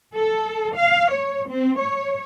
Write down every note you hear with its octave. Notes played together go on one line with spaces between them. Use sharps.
A4
F5
C#5
C4
C#5